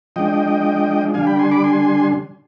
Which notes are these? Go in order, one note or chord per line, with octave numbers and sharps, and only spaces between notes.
F3 G#3 D4 D#5 G5
D3 G3 D4 F5 G#5
G5 B5
G#5 C6
B5 D6
G#5 C6